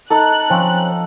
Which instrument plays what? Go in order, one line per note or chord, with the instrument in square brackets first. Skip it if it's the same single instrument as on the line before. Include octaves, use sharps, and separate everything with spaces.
[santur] D#4 A4 [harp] A5 [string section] F#6
[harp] F3 [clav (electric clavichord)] C4 C#4